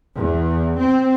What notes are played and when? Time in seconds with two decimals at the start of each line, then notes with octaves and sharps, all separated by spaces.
0.16 E2
0.79 C4